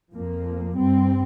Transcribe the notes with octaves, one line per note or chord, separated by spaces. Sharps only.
F2 F3 A#3
G2 G3 C4